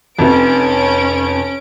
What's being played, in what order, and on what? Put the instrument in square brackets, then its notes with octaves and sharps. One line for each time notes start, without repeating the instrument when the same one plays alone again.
[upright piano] F1 F2 [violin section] C#4 D7